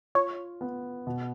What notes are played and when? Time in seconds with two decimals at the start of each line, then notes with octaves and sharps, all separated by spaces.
0.15 F4 C#5
0.61 B3
1.07 B2